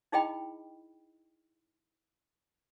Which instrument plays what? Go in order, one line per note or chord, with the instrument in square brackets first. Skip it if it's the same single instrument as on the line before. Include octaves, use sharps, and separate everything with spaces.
[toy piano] D#4 E4 G#4 D#5 G5 B5